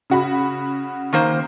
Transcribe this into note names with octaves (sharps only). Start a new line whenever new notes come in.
C#3 F#4 B5
D#3 A#3 C5